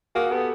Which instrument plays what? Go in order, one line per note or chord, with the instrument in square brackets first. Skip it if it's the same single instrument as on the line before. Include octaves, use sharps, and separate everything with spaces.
[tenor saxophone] A#3 [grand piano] F#4 G#4
[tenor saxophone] B3 [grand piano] G4 A4